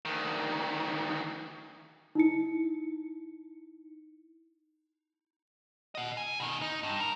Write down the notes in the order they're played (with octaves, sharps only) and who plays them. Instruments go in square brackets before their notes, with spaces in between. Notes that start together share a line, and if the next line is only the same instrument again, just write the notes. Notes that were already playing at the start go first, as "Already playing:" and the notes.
[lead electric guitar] D2 D#3
[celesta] D#4 E4 C#7
[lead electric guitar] D#5 F#5
G#5
B2 D#3
D#4
G2
A#4